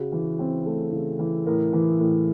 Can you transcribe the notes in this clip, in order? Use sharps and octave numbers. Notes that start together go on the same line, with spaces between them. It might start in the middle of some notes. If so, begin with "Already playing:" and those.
Already playing: C#3 F#4
E3
C4
A3
C#3
E3
A2 A#4
E3
A2